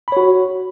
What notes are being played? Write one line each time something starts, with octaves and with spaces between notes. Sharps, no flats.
F#4 C#5 B5